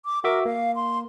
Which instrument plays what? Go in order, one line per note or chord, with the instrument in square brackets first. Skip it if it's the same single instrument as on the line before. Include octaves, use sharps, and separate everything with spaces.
[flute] D6
[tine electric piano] F#4 E5 D6 [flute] A#4
[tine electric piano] A#3 [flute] F5
[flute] C6